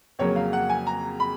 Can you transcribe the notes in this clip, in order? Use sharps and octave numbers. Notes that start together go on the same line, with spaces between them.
F2 C#3 F#3 A#3 C#5
F5
F#5
G#5
A#5
B5